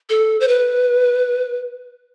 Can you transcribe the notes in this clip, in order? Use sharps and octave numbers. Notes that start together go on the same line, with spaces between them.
A4
C5
B4